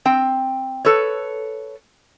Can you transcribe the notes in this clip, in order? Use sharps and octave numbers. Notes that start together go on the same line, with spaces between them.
C4 G5
A4 B4 C#5